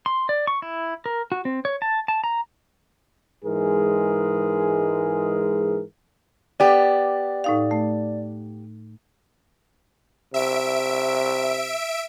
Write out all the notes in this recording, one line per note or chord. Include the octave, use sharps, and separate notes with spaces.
C6
D5
C#6
E4
A#4
F#4
C4
C#5
A5
A5
A#5
G#2 E3 G#3 G#4 A#4
B3 G4 D5
A2 D#4 F5
A3
C3 E5 D7